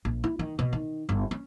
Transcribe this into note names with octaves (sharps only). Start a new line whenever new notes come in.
A#1
E4
D#3
B2
D#3
G1
C#4